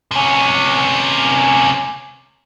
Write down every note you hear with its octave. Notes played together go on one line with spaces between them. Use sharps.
C3 C#4